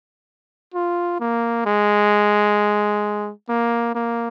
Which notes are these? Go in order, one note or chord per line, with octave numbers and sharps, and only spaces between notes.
F4
A#3
G#3
A#3
A#3